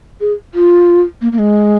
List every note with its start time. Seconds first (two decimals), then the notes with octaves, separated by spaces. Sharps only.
0.21 G#4
0.54 F4
1.22 A#3
1.32 A#3
1.39 G#3